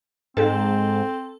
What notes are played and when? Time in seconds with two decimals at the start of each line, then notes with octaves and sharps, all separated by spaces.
0.37 G#2 C4 A4